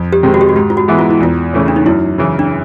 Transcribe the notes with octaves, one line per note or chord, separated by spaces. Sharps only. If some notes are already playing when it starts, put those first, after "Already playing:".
Already playing: F2
G4
C3 D#3 G#3 C4
F#4
G4
F#4
G#2 G4
F4
F#4
E3 G#3 B3 E4
F4
E4
E2 F4
C#3 E3 A3 C#4
D4
D#4
F#2 E4
C#3 E3
D4